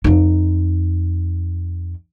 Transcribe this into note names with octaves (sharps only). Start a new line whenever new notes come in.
F2 D#4